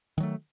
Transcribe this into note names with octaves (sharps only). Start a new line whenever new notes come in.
D#3 F#3 A3